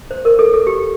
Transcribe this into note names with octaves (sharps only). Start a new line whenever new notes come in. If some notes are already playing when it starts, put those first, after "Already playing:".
C5
A#4
A4
A4
G4